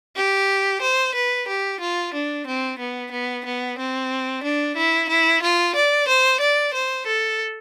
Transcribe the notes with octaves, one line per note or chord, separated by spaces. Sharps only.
G4
C5
B4
G4
F4
D4
C4
B3
B3
B3
C4
D4
E4
E4
F4
D5
C5
D5
C5
A4